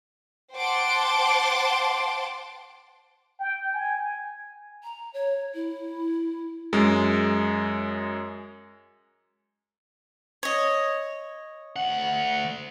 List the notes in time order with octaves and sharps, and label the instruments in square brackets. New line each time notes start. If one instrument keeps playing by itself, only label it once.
[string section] C5 F#5 G5 A5 C6 D6
[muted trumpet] G5
G#5
[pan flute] A#5
C#5
E4
[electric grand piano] F#2 G#3
[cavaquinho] C#5 D#5
[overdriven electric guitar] D2 F#5